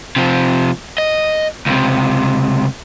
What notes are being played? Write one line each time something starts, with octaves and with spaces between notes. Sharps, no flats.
C3 F3
D#5
C#2 C3